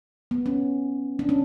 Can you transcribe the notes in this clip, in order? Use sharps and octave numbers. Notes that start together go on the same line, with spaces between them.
B3
C#4
D4
C#4